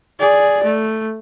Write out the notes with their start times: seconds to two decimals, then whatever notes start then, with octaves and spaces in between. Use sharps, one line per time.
0.20 G#4 D5
0.64 A3